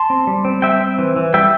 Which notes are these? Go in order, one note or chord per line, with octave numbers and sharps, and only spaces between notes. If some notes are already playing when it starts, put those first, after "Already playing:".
Already playing: A5 C6
C4
G3
C4
G3 E5 G5
C4
E3
E3
G3 E5 G5